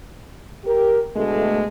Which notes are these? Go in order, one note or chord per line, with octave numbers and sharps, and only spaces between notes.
G4 A#4
B2 D3 G#3 A3